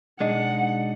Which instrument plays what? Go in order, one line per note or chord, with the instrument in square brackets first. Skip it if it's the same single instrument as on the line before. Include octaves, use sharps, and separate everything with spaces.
[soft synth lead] B2 [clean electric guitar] G#3 D4 D#4 [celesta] D#5 [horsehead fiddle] F#5